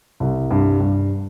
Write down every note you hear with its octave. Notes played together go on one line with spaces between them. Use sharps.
C2
G2
G2